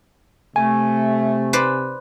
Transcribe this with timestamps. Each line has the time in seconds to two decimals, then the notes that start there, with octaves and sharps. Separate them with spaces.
0.56 C3 A3 G#5
1.53 B4 C5 D5